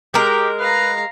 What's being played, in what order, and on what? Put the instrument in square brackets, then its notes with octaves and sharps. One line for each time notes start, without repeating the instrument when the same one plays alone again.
[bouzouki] G#3 A#4 [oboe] G4
[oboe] B4 [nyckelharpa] F5 A#5